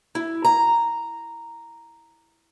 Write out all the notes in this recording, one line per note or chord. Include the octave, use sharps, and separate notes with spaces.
E4
A#5